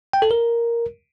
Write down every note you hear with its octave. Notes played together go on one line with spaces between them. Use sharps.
G5
A4
A#4